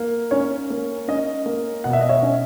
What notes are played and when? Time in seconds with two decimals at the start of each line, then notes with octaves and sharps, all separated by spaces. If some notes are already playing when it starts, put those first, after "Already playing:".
Already playing: A#3
0.31 C#4 C#5
0.70 A#3
1.08 C#4 D#5
1.46 A#3
1.84 B2 F#5
1.93 E5
2.01 D#5
2.09 C#5 E5
2.23 C#4